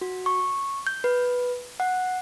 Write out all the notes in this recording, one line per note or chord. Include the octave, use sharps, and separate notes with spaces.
F#4
C#6
G6
B4
F#5